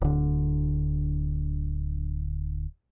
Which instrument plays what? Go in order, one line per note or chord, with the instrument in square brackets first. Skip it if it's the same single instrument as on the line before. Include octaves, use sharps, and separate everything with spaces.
[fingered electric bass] D1 D3